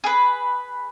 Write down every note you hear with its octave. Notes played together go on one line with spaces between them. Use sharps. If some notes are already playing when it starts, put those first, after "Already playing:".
G#4 B4